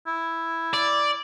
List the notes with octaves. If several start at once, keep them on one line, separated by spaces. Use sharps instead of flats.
E4
D5